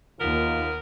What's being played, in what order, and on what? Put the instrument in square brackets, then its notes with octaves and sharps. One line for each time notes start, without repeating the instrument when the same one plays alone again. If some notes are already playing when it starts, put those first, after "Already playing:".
[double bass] D#2 [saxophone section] B3 A#4 [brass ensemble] D#4 F4